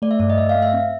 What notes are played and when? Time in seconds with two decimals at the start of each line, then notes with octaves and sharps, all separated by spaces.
0.02 A3 D5
0.11 E5
0.19 G2 D5
0.30 D#5
0.38 G2 E5
0.49 F5
0.55 A3
0.62 E5
0.73 C4